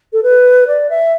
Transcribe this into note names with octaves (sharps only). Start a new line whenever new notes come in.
A4
B4
D5
E5